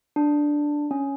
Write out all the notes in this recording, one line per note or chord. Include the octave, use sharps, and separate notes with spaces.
D4
C#4